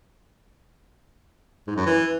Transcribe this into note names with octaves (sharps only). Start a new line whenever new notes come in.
G#2
F#2
E3